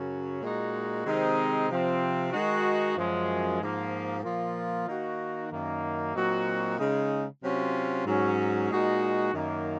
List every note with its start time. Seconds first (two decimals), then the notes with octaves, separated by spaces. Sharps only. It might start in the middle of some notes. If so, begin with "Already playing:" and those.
Already playing: F#2 C#3 F#3 C#4
0.42 A#2 G#3 D#4 F#4
1.05 C3 D#3 G#3 C4 D#4
1.69 C3 F3 C4
2.32 D#3 G#3 D#4 F#4
2.96 F#2 F3 G#3
3.60 G#2 F3 A#3
4.23 A#2 F3 A#3 F4
4.87 D#3 A#3 D#4 F#4
5.51 F#2 D#3 A#3
6.15 A#2 F#3 C4 D#4 F#4
6.78 C#3 G#3 D#4
7.42 C3 F#3 C#4 F4
8.05 G#2 F#3 C#4
8.70 A#2 G#3 D#4 F#4
9.32 F#2 D#3 A#3